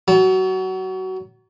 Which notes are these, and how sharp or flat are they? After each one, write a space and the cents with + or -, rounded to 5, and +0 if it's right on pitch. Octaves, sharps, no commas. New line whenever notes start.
F#3 +20 A5 -30